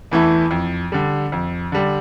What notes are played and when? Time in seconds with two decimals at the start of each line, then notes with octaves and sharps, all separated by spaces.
0.12 E2 E3 A3 E4
0.51 F2
0.92 D3 G3
1.32 F2
1.72 D3 G3